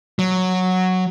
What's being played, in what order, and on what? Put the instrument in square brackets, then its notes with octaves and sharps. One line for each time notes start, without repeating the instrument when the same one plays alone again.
[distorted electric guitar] F#3